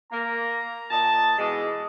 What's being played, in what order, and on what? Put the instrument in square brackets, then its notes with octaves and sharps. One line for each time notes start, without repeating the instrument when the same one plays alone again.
[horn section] A#3 [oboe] A#5
[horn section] A#2 D#5 A5
[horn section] B2 E3 G#3 [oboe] D#5